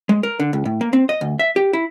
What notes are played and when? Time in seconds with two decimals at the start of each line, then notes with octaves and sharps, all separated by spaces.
0.09 G#3
0.23 A#4
0.40 D3
0.53 C#2
0.65 A2
0.81 A#3
0.93 C4
1.09 D#5
1.21 D2
1.39 E5
1.56 G4
1.73 E4